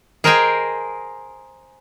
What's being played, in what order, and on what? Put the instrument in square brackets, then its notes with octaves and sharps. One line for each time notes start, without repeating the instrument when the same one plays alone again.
[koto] G#4 A#4 C5 D#5 G5 G#5